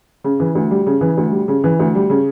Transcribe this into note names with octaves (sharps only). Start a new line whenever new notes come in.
C#3
E3
D2
G3
C#3
E3
D2
G3
C#3
E3
D2
G3
C#3